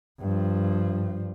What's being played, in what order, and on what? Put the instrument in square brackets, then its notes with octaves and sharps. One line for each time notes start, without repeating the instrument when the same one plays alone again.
[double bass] G2 F3